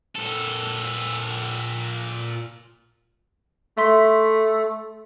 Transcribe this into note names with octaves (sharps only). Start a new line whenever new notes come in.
A#2 A4
A3 E5 C6 B6